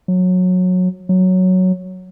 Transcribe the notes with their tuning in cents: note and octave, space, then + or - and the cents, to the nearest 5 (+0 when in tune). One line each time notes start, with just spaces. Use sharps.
F#3 -20
F#3 +0